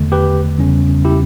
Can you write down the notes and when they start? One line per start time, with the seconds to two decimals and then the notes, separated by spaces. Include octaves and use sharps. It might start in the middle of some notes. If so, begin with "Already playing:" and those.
Already playing: E2 D3 A3
0.12 G4 B4
0.58 E2 C#3 G3 C#4
1.05 E4 G4